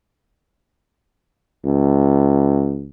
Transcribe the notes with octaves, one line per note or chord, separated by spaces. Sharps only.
C#2